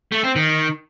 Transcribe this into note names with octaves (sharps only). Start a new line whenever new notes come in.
A3
C4
D#3